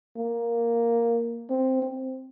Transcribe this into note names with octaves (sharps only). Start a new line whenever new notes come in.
A#3
C4
C4